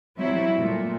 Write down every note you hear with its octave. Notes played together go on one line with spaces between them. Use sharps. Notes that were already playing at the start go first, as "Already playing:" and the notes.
F#3 G3 C4 E4
A#2 A3